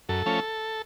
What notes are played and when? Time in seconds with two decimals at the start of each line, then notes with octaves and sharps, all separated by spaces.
0.09 F#2 A4
0.26 F3 A3 C#4